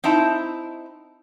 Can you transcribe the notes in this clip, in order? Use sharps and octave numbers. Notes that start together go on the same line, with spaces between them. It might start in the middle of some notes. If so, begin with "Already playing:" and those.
C4 D#4 E4 A5